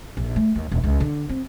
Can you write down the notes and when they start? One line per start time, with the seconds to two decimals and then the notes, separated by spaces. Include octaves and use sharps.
0.17 A#1
0.36 A3
0.55 D#2
0.72 D#1
0.83 C#2
1.00 D3
1.29 C4